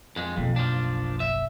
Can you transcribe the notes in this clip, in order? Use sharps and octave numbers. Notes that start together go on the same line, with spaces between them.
F2 G#3
F#1 B1 F2
F3 D4
E5